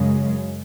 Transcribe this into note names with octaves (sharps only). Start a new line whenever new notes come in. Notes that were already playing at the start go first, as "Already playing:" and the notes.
Already playing: F#2 C#3 G#3